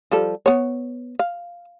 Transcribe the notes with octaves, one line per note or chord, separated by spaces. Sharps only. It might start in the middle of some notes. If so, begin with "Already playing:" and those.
F3 G3 A4
B3 C#5
F5